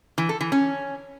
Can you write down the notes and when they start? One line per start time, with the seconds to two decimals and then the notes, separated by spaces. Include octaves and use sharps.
0.18 E3
0.29 A4
0.41 E3
0.52 C#4